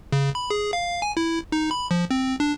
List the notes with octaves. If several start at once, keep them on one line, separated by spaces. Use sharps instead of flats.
C#3
B5
G#4
F5
G#5
E4
D#4
B5
F3
C4
D4